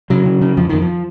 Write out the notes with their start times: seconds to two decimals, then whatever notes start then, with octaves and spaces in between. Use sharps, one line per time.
0.10 C#3 F#3
0.26 C#3
0.42 C#3
0.57 F2 F3
0.69 F2 D#3
0.82 F3